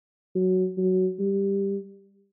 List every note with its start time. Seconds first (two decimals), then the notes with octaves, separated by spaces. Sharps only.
0.35 F#3
0.77 F#3
1.19 G3